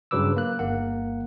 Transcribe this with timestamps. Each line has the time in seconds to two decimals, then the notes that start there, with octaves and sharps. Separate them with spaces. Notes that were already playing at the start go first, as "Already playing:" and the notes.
0.11 G2 C#3 F#3 B4 D6 E6
0.36 A#3 F#6
0.59 G1 A#3 F#5